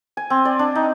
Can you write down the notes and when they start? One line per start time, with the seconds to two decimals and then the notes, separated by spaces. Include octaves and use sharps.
0.17 G#5
0.30 C4
0.45 D5
0.59 D4
0.75 D#4